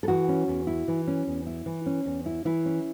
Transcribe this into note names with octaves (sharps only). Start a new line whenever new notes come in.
A4
E3 F#4
C#4
E2
E4
E3
C#4
E2
E4
E3
C#4
E2
E4
E3 E4
C#4